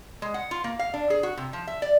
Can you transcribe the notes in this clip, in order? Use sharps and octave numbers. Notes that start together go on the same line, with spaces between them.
G#3
F#5
F4
A#3
F5
D4
G#4
F#4
C3
F3
E5
D5